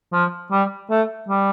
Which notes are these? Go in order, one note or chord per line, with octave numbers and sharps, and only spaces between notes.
F3
G3
A3
G3